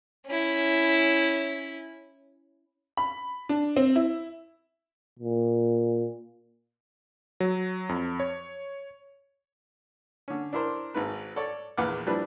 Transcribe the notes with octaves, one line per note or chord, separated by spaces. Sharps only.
C#4 E4
B5
D4
C4
E4
A#2
F#3
F2
C#5
D3 C#4
D4 E4 A#4 C5
G#1 G#2 B4
A4 C#5 D5
A#1 E2 B4 F#5 D6 F6
F3 G3 D4 E4 B4